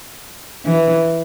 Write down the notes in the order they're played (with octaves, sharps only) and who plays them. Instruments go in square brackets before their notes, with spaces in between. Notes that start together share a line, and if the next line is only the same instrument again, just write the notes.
[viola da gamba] E3